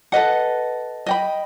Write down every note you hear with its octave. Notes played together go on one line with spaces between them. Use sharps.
A4 B4 D#5 F#5
D#5 G5 B5